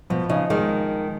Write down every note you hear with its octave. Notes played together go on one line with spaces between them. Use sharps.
B2 F3
C#3 D#4
D#3 G#3